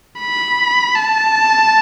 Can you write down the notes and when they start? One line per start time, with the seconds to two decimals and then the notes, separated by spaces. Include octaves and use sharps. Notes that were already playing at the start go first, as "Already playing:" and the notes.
0.20 B5
0.95 A5